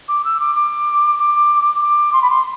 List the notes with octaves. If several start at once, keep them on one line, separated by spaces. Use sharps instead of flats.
D6
E6
D6
D6
D6
D6
C6
B5
C6